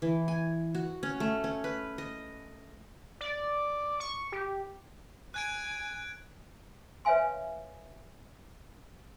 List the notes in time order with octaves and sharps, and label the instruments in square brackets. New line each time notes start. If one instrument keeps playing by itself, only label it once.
[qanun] E3
G#5
F#4
C#4
A3
C#4
B4
D#5
[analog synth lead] D5
C#6
G4
[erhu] G#5 [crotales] F#6 G#6 D7
[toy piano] B4 C#5 E5 F5 G#5 C6